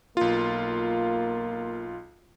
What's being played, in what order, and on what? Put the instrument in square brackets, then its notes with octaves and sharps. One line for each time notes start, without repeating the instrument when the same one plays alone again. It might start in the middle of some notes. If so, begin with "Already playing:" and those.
[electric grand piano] B1 F4 [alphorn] A#3